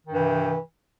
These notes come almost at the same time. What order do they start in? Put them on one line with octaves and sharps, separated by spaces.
D#3 G2 E3 C3